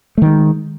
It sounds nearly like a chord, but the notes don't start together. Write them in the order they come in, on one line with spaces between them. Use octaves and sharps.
A3 D#3 G#3